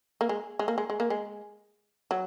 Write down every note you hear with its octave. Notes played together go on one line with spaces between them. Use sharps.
A#3
G#3
G#3
A#3
G#3
G#3
A#3
G#3
F#3